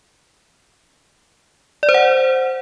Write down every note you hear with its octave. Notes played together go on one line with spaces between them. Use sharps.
D5
C5
F#5